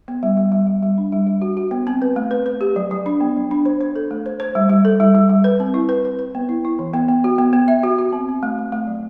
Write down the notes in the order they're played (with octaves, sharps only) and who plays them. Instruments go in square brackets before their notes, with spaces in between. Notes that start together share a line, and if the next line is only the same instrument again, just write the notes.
[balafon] B3
G3
G3
G3
G3
G3
D4
G3
G3
F#4
F#4
B3
C4
B4
A3
B4
B4
G4
F#3
F#3
D4
B3
F#3
D4
C5
C5
A4
A3
C5
C5
G3
G3
A4
G3
G3
G3
B4
C4
E4
B4
B4
B4
B3
E4
E4
E3
B3
B3
F#4
B3
B3
E5
F#4
F#4
C4
C4
A3
A3
A3
F#3